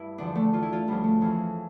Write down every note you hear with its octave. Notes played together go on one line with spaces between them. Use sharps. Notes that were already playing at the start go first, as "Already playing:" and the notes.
Already playing: G2 E4
E2 D3 F3 D4
A3
E2 E3 F4
E4
F4
D2 C#3 F3 G3
A3
F2 C#3 E3